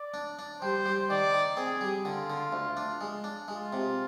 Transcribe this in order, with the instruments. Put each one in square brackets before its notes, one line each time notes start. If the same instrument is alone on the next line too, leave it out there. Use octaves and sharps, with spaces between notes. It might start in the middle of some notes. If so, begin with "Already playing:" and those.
Already playing: [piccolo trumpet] D5
[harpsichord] D4
D4
[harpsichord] G3 [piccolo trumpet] C5
[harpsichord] G3
[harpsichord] D#3 [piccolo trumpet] D5
[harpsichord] D#3
[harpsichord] C4 [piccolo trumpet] G#4
[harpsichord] G3
[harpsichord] D3 [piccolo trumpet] F4
[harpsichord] D3
D2
D4
G#3
D4
[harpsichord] G#3 [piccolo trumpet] F4
[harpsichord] C3